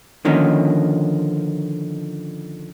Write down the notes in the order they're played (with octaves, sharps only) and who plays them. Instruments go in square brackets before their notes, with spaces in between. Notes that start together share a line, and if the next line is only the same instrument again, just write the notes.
[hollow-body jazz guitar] D3 D#3 F3 A#3 C#4 D#4